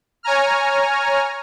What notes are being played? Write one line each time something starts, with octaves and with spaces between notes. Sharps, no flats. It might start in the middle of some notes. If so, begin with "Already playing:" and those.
C#5 G#5 A#5 F6